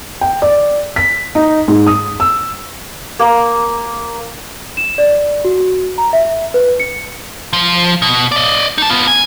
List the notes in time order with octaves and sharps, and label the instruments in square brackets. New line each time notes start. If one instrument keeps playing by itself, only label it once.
[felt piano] G5
D5
B6
D#4
G#2
D#6
E6
[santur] A#3
[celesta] E7
D5
F#4
A#5
E5
B4
C#7
[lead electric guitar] F3
B2
D5 D#5
D#4 A5
B3 F4
G#5